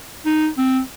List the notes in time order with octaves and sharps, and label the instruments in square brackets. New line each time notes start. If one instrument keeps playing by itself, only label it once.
[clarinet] D#4
C4